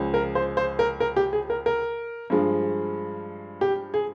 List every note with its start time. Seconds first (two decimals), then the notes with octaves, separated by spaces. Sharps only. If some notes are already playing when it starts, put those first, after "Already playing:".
Already playing: C#2 C#3 F3 G#3
0.14 A#4
0.35 C5
0.57 C5
0.79 A#4
1.00 A#4
1.16 G4
1.33 G#4
1.50 A#4
1.66 A#4
2.30 G2 F3 G#3
3.61 G4
3.94 G#4